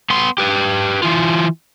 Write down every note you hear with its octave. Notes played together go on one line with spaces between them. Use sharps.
B3 C6
G4 B4
E3 F4